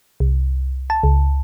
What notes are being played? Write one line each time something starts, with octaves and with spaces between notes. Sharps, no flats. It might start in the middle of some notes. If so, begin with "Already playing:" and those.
C2
A5
C#2